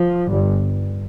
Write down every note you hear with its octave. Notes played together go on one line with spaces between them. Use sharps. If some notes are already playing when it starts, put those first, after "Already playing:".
Already playing: F3
G1 G2